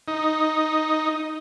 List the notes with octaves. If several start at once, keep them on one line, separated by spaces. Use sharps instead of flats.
D#4